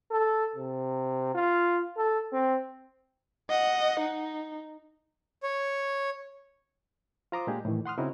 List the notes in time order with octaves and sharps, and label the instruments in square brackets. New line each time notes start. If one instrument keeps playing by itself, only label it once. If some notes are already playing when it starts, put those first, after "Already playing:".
[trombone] A4
C3
F4
A4
C4
[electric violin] D#5 F#5
D#4
[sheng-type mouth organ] C#5
[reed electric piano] F4 C5 A#5 C6 D6 D#6
A#2 G#3 A#3 D4 G4 G#4
A2 D#3 E3
F#5 C6 D#6 F6
C#3 C4 C#4 D#4 E4 F#4